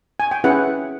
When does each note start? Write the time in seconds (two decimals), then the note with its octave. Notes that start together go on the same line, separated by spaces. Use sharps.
0.20 G#5
0.31 G5
0.44 C#4 E4 G#4 B4 F#5